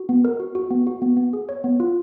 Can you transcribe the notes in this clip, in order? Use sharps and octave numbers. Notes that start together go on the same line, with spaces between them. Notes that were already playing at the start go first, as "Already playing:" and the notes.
Already playing: F#4
B3
A#4
F#4
F#4
B3
F#4
B3
B3
G#4
C#5
B3
F4